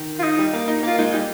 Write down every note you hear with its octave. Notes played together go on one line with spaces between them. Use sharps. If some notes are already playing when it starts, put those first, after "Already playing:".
Already playing: D#3
F4
D#4
G3
A#3
D#4
A#3 F4
G#3 D#4
G3 D#4